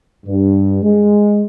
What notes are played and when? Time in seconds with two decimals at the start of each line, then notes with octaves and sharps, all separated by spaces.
0.26 G2
0.83 G#3